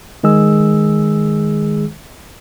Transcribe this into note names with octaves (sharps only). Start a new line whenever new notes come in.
D#3 G#3 G#4 E6